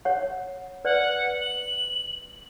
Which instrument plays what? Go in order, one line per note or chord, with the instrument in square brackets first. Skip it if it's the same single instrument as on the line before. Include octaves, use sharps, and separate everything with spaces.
[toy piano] C#5 F#5
[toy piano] B4 D5 [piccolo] F#5
[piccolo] F#7